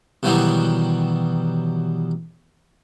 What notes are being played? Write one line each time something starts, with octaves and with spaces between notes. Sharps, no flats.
B2 D#3 E3 F#3 G3